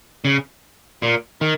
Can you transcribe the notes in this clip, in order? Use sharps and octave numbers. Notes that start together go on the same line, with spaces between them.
C#3
A#2
D#3